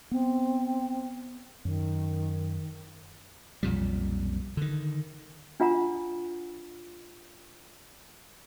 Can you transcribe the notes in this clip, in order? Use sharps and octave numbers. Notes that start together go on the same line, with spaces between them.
B3 C4
F#2 D#3
B1 F2 A#2 G3
D3 D#3
D4 F4 F#5 A#5